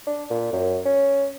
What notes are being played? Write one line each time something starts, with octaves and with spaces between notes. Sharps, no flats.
D4
A#2
F#2
C#4